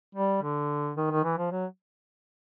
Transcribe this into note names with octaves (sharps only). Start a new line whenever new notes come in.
G3
D3
D#3
D#3
E3
F3
F#3